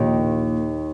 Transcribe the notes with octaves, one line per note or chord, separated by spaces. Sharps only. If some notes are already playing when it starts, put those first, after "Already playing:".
Already playing: A#1 D#2 A#2 D#3 F3 A#3